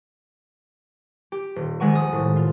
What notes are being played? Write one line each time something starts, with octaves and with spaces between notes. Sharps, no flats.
G4
D#1
A#1 D#3 G#3 F#5 C#6 D#7
D#6
C2 A2
F4